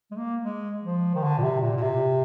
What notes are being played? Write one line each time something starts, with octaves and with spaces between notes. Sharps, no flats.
G#3
A#3
G#3
F3
D#3
D3
A#2
C3
A#2
A#2
C3